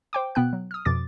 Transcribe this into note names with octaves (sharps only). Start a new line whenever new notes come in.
C5 G5 D6
B2 B3 G5 F#6
F#3
D#6 F6
F2 B2 F3 D6 A6